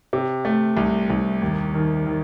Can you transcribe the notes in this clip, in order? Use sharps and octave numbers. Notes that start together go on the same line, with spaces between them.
C3
A3
C2
C2
D#2
D#3
D#3